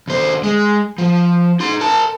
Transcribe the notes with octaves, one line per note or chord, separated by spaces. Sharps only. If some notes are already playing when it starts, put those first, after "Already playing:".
D#2 C5
G#3
F3
D#4 C6
A#4 A5